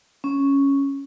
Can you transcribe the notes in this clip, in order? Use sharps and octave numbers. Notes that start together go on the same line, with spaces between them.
C#4